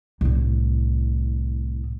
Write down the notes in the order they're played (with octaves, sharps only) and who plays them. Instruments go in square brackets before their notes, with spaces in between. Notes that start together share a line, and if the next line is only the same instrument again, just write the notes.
[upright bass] C2 A2